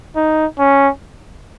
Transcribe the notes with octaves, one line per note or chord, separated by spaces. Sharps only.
D#4
C#4